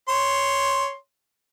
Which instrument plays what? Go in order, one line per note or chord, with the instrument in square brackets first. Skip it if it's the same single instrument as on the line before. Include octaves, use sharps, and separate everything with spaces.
[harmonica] C#5 C6